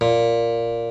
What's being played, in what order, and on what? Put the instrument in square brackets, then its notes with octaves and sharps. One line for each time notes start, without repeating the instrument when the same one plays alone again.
[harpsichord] A#2